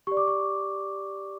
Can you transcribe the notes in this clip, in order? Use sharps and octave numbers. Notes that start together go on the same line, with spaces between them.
G4 D5 C#6
D6
C#6